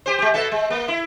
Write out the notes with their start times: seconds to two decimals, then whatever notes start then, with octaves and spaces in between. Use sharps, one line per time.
0.06 G4 C5
0.19 G#3 G4
0.34 B2 A4 E5
0.52 G#3
0.70 A#3
0.88 E4